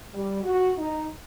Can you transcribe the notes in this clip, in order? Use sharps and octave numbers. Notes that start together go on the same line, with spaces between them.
G3
F#4
D#4